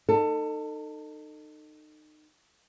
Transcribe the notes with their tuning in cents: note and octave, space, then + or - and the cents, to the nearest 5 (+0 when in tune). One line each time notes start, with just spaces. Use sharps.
D#4 -25 A4 +25